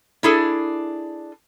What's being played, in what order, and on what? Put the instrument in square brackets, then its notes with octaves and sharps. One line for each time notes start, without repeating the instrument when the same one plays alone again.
[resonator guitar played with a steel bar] D4 E4 G#4 A4